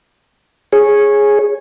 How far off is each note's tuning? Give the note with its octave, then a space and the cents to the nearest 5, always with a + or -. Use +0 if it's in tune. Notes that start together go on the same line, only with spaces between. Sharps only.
G#4 +0 C#5 -15